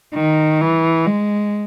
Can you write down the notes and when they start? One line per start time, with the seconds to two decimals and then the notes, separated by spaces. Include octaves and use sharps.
0.15 D#3
0.61 E3
1.06 G#3